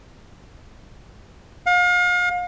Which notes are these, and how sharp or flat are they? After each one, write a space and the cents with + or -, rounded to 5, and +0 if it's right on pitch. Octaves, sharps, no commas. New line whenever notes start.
F5 +40